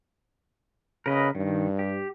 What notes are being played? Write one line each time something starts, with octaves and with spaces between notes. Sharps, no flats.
C#3 A#4 B4 D#5
G2 D#3
G4